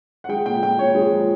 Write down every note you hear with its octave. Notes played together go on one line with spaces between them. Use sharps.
F#5
G#3 G5
A#2 G5
A#2 G5
A#2 C#5
G#3
F3